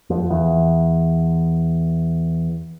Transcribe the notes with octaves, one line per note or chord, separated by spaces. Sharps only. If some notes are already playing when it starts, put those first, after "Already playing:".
F2
E2